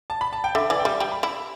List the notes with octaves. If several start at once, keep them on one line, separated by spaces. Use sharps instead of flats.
A5
B5
A5
G5
D3 E5
E3 D5
G5
G3 E5
G3 G5
B5
E4 B5